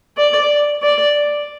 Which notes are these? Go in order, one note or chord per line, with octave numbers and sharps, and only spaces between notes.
D5
D5